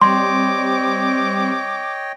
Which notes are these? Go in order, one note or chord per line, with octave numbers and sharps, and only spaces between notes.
G3 C4 C#5 D#5 G5 C6 D6